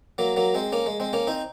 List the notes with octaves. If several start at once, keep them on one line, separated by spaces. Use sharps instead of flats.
F#3 A#3
F#3 A#3
G#3 C4
A#3 C#4
G#3
G#3 C4
A#3 C#4
C4 D#4